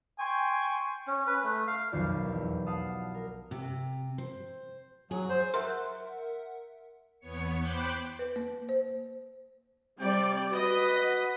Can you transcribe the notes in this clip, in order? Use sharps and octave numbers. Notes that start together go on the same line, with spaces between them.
G5 G#5 C6 C#6
C#4
B4
A3
F5
B1 F2 D#3 F3 G4 D5
E2
F5 F#5 A5 D#6
A#4
C3
C5
F#3 G#4
C5
A#4 E5 F#5 C6
E2 B3 C#5 C#7
C5 G5 B5 D6 F#6 G6
B4
A#3
C5
C3 G3 C4 D5 G5
F#4 B4 D#5